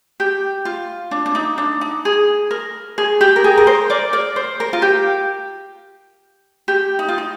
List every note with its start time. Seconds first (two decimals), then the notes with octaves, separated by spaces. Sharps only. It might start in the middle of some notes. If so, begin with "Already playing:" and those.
0.20 G4
0.65 F4
1.11 D4
1.26 D4
1.35 D#4
1.58 D4
1.81 D#4
2.05 G#4
2.51 A#4
2.98 G#4
3.21 G4
3.36 A#4
3.44 G#4
3.57 A#4
3.67 C5
3.90 A#4 D5
4.13 A#4 D5
4.36 C5
4.60 A#4
4.73 F4
4.82 G4
6.68 G4
6.99 D#4
7.08 F4
7.18 D#4